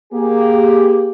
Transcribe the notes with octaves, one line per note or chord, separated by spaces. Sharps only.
A#3 G4 G#4